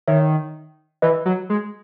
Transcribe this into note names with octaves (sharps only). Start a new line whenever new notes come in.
D#3 C#5 E5
E3 B4 D#5
F#3
G#3